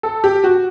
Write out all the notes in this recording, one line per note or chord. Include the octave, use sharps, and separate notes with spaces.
A4
G4
F#4